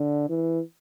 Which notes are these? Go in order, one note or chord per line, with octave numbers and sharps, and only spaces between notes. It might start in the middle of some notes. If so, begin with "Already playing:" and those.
Already playing: D3
E3